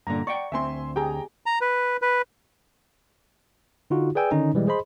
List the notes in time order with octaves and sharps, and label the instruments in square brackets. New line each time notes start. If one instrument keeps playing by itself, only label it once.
[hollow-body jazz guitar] G2 A#2 D3 [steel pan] A#5
[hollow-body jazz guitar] D5 F#5 G5 [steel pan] C#6
[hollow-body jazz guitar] D2 C4 [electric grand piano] E5 G#5 C6
[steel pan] G4 G#4 [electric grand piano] G5 A#5
[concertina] A#5
B4
B4
[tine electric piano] D3 D#4 F4 F#4
G#4 B4 D5 G5 G#5 E6
D3 D#3 C#4 D#4
B2 E3 G3 G#3
G#4 C5 D#5 B5 C6